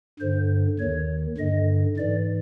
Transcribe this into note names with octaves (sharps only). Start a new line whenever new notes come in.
G2 D3 C5
D#2 D#3 C#5
G2 D3 D#5
G#2 E3 D5